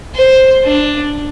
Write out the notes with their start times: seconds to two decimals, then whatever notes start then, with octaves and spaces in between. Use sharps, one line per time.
0.15 C5
0.64 D4